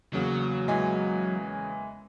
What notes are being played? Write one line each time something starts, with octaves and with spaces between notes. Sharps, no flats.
E2 C#3 F#3 A#3
E3 G#3